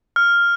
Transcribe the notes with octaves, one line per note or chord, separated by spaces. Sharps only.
F6